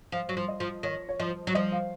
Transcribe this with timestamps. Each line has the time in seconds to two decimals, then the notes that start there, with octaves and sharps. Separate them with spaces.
0.12 F3 F5
0.29 F#3
0.37 F3
0.48 D#5
0.60 F3
0.83 D#3 C#5
1.09 C#5
1.19 F3 D#5
1.47 F#3
1.55 F3 D#5
1.72 F5